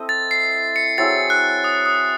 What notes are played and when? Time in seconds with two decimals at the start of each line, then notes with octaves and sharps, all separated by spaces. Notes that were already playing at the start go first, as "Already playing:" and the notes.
Already playing: C4 E4 A4 D#5
0.09 A6
0.31 C7
0.76 C#7
0.98 F#3 C4 E4 G#4 A6
1.30 F#6
1.64 D#6
1.86 D#6